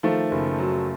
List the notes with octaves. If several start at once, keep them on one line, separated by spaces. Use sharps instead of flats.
D#3 F3 A3
F#1
F#3